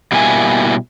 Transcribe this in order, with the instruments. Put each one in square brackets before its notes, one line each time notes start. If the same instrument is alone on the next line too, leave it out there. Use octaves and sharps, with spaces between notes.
[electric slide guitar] B2 G3 A#3 E4 G#5